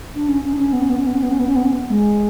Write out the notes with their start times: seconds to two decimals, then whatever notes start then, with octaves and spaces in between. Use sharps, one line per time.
0.15 D4
0.28 C#4
0.44 C#4
0.53 D4
0.58 C#4
0.73 B3
0.81 C#4
0.89 B3
0.98 C#4
1.07 B3
1.15 C#4
1.22 B3
1.31 C#4
1.39 B3
1.47 C#4
1.56 B3
1.65 C#4
1.72 B3
1.90 G#3